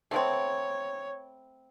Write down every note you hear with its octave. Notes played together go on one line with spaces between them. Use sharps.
A3 B3 C4 C#5